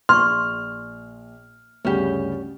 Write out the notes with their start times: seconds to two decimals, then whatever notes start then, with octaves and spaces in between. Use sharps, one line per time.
0.09 A#1 C6 C#6 F6
1.85 D2 G2 C#3 C#4 G4